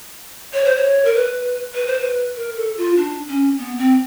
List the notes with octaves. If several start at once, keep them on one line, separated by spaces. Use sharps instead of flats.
C#5
C5
C#5
A#4
B4
B4
C5
B4
A#4
A4
F4
D4
C#4
B3
C4